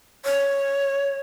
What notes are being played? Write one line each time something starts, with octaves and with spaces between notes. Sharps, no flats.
C#5